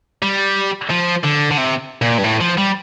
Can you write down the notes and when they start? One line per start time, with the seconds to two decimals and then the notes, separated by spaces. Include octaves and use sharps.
0.23 G3
0.90 F3
1.24 D3
1.51 D3
1.57 C3
2.02 A#2
2.18 G2
2.24 A2
2.41 F3
2.58 G3